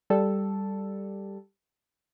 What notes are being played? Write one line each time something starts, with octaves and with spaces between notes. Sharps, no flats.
G3 A4